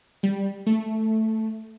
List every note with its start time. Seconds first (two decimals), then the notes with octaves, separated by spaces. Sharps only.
0.23 G3
0.66 A3